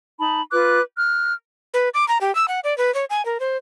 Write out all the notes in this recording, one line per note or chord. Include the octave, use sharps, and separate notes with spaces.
D#4 A5 B5
F4 B4 D6 F#6
F6 F#6
B4
D6
A#5
G4
E6
F#5
D5
B4
C#5
G#5
A#4
C5